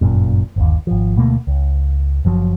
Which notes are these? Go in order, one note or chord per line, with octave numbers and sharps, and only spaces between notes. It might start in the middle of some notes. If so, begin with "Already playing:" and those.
G1 F#2 A#2
G1 D#2
G#1 F3
D2 B2 A3 A#3
C#2
F#1 F3 F#3